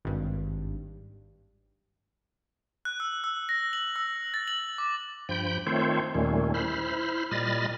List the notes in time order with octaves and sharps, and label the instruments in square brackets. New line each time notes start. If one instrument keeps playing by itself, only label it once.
[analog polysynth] G#1 G2
[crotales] F#6
E6
E6
A#6
F#7
E6
A6
F#7
D6
[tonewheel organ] G2 F3 G5 B5 G6
D#3 A3 C4 F4 C5 C#5
D#2 A#2 D#3 G3 A3 C#4
E4 C5 B5 F6
A#2 G3 D#5 B5 F6 A6